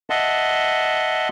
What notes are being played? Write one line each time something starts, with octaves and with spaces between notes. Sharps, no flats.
D#5 E5 F#5 A5 C6